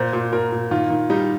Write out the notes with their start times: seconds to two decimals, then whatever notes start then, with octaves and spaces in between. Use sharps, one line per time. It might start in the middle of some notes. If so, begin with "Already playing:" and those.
Already playing: A#2 C5
0.13 A#2
0.32 A#2 A#4
0.52 A#2
0.71 D#3 F4
0.90 D#3
1.10 G3 D#4